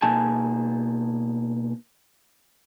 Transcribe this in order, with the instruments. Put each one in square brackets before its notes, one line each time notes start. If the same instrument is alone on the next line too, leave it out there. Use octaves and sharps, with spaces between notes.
[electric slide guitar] B2 A#3 D#4 G#4 G#5 A5